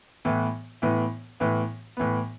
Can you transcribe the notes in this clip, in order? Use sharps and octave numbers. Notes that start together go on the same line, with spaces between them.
A2 E3 B3
A2 E3 B3
A2 E3 B3
A2 E3 B3